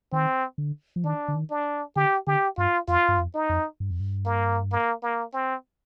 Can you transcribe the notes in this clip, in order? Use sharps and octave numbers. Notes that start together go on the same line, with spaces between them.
D#3 C4
D3
F3
D#3 D4
D3
D#3
D4
D3 G4
D3 G4
G2 F4
F2 F4
G2
F2
D#4
F2
G2
F2
G2
A#3
A#3
A#3
C4